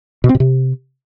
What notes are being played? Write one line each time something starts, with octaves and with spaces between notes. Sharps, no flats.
B2
C4
B2
C3